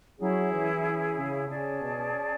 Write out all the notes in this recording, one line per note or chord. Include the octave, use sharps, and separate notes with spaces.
F#3 C#4 E4 G#4
E3
C#3
C#3 C#4 G#4 D5 A5
B2